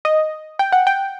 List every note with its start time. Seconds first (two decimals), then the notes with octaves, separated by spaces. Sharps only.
0.05 D#5
0.59 G5
0.72 F#5
0.87 G5